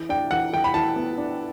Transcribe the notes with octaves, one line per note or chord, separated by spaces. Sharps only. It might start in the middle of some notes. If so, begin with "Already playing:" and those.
Already playing: E3
D4 G5
E3 F#5
E3 G5
B5
E3 A5
B3
D4